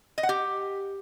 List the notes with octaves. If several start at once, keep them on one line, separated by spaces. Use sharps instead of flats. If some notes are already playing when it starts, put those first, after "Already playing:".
D#5
F#5
G4